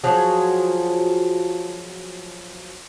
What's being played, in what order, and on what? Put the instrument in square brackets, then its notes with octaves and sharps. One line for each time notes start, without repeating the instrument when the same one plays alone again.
[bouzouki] F3 F#3 G#4